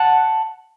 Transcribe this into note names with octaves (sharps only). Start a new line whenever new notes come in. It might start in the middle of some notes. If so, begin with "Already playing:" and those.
Already playing: F#5 A5